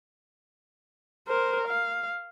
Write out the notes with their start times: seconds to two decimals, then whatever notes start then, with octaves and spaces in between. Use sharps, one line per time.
1.28 A#4 C5
1.68 F5